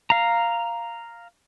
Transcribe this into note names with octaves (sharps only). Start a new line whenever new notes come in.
F5 A#5